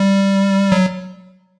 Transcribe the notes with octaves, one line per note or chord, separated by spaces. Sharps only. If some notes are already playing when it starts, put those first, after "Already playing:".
Already playing: G3
F#3